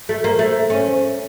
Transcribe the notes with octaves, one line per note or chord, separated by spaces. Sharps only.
A3
A#3
A3
C#4